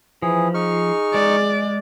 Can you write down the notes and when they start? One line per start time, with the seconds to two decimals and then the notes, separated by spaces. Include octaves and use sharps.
0.22 E3 F3 G#4
0.54 D#4 G#4 C#6 F6
1.14 G#3 D5